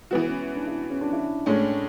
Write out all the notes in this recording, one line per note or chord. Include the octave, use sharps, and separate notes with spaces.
E3 G#3 B3 F#4
C#4
D4
E4
C#4
D4
E4
A2 G#3 C#4 D4